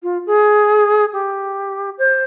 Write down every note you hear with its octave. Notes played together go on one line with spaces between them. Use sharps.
F4
G#4
G4
C5